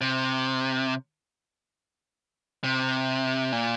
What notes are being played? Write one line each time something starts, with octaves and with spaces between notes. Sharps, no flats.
C3
C3
A#2